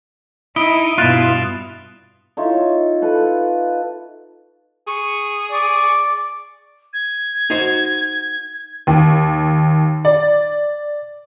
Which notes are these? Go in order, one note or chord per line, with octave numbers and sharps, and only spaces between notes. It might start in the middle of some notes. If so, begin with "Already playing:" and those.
D#4 E4 D#6 D7 G7
G2 B2 E4 F4 F#6 A6 E7
D#4 F4 C#5 E5
A4 B4
G#4 C#6
D5 C#6
G#6
D#4 F#4 C5
D#2
D5